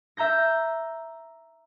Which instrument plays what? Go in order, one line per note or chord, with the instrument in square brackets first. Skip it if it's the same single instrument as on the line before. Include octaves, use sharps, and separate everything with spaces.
[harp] E5 A#5 G6 A#6